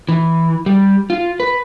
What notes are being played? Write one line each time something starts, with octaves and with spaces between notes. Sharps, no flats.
E3
G3
F4
B4